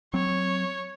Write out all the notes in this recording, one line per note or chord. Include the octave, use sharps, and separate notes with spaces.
F#3 C4 C#5